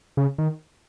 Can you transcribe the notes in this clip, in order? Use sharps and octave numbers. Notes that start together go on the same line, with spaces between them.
C#3
D#3